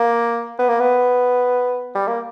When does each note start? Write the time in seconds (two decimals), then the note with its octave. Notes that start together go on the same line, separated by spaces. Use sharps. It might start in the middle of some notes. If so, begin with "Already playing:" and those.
Already playing: A#3
0.59 B3
0.69 A#3
0.80 B3
1.95 G3
2.07 A#3